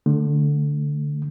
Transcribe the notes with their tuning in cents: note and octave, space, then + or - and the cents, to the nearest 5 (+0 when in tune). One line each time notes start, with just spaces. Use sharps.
D3 -5 A3 +0